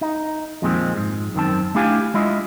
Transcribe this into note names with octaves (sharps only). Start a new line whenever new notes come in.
D#4
F2 A#2 D#3 F3 G#3 C4
G#2
F#2 D#3 C4 A5
A3 D4 E4 G4 F5 G#5
G#3 E4 F4 D#5